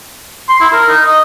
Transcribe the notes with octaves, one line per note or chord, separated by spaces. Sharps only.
C6
E4
A#4
D#4
D#5